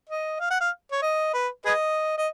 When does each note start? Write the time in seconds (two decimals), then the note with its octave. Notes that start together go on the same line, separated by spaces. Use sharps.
0.09 D#5
0.40 F5
0.51 F#5
0.61 F5
0.92 C#5
1.02 D#5
1.34 B4
1.65 G#4 B4 D#5
2.18 D#5